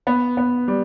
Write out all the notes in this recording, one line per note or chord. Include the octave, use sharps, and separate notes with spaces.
B3
B3
G3